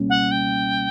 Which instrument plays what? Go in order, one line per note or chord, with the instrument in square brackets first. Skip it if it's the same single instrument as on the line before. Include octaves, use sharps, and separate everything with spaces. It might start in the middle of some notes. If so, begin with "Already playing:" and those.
Already playing: [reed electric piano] C#2 B2 G3 A#3 C#4
[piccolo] F#5
G5